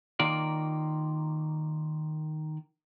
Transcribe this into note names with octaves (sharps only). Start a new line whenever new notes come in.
D#3 A#3 F4 D5